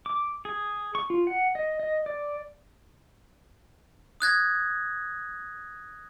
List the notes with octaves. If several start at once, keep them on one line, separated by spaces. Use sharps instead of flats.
D6
G#4
C#6
F4
F#5
D#5
D#5
D5
D#6 F#6 G#6 A#6